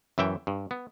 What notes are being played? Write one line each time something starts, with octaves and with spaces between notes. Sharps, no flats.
F#2 E3 E5 G5
G2
B3